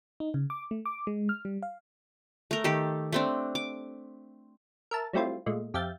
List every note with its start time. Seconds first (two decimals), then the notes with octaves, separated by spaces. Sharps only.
0.20 D#4
0.34 C#3
0.50 D6
0.71 A3
0.86 D6
1.07 G#3
1.29 F6
1.45 G3
1.63 F5
2.51 A3 A#4
2.64 D#3 G4 A4
3.12 A3 C4 D4
3.55 D6
4.91 A#4 E5 A5
5.13 F#3 G3 A3 C4 E4 F4
5.46 A#2 G#3 A3
5.74 F2 G4 E5 F5 G6 A6